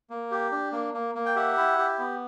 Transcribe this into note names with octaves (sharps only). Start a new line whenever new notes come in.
A#3
G4
D4
A#3
A#3
A#3
G5
G4 E5 F#5
E4
G4
B3